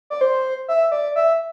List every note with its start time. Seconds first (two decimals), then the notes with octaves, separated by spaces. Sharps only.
0.10 D5
0.21 C5
0.68 E5
0.92 D5
1.16 E5